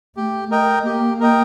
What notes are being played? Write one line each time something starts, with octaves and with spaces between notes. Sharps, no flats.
A3 G4
A3 A#4 D#5 G5
A#3 G4
A#4 D#5 G5